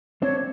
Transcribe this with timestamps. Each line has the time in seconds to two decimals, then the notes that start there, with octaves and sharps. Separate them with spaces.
0.22 C4 D4 C#5